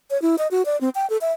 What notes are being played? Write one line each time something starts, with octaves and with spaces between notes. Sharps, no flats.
C#5
E4
D#5
F#4
D5
C4
G5
A4
E5